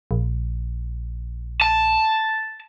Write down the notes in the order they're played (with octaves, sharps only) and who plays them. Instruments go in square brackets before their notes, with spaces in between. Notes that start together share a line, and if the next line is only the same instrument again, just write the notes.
[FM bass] A#1
[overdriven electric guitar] A5